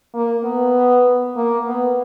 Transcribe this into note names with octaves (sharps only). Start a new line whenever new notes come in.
A#3
B3
A#3
B3